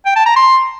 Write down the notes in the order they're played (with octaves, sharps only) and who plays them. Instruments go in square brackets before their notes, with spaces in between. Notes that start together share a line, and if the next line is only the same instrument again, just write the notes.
[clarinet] G5
A5
A#5
C6